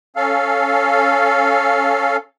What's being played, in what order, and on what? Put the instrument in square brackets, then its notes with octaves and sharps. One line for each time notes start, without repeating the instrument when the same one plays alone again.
[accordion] C#4 A4 F5